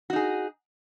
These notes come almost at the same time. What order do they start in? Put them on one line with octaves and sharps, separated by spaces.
F#4 D#4 G#4